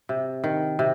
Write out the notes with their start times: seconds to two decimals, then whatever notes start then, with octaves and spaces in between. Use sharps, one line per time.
0.09 C3
0.44 D#3
0.79 C3